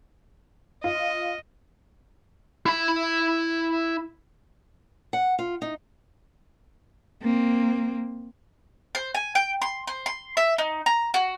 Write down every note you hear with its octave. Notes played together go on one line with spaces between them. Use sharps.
F4 D#5
E4 B5
F#5
F4
D#4
A#3 C4
C5
G#5
G5
C6
C5
C6
E5
D#4
A#5
F#4